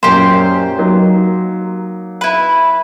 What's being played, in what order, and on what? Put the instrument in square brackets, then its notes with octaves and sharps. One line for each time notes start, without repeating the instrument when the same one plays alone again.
[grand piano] F#2 A#2 C#4 [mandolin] G4 C5
[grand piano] F#3 A#3 D#4
[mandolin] E4 B4